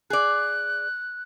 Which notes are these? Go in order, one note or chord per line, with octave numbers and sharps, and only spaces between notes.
G#4 D5 F#6